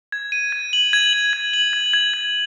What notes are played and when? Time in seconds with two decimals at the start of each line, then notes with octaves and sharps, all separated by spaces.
0.12 G#6
0.32 D#7
0.52 G#6
0.73 F#7
0.93 G#6
1.13 F#7
1.33 G#6
1.53 F#7
1.73 G#6
1.93 G#6
2.14 G#6